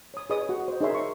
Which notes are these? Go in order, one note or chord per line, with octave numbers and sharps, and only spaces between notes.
C#5 D#6
G#4 B4 C#5 D#5 D#6
F#4 F#5
C5 D#5
D#4 G#4 A#4 C#5 E5 C6
E5 C6 C#6